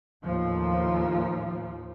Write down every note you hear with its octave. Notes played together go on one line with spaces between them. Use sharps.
D#2 A2 F3